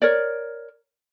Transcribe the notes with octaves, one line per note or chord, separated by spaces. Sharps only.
A#4 C#5 D5